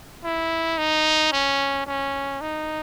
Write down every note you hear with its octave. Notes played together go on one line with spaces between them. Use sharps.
E4
D#4
C#4
C#4
D#4